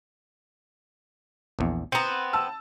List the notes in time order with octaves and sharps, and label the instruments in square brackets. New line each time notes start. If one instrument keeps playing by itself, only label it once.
[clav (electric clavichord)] A#1 E2
[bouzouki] B3 C4 [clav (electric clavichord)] G5 A#5 [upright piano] C#7 D#7
[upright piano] A5 E6